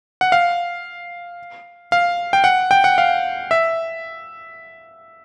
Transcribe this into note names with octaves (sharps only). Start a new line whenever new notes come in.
F#5
F5
F5
G5
F#5
G5
F#5
F5
E5